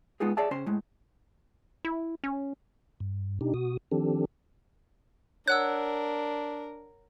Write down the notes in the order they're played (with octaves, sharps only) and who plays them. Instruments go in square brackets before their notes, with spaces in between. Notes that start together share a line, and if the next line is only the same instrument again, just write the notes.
[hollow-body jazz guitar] G#3 B3 D#4 F4 G#4
G#4 C#5 D5 E5 A5
C#3 C#4 C5 C6
A2 G#3
[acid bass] E4
C#4
[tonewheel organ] G2
B2 D4 D#4 G4
B2 F#4 D#6
D#3 F3 C4 D4 G4 A4
[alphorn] D4 [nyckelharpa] A#4 [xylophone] C#5 F#5 E6 [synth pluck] F#6